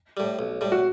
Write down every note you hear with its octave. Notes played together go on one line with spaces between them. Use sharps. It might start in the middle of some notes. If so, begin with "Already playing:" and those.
A2 G3
B1
A2 G3
F#4